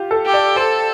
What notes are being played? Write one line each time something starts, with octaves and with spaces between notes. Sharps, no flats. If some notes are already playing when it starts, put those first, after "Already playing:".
Already playing: F4 G4
A4
G4
D5
A4 C5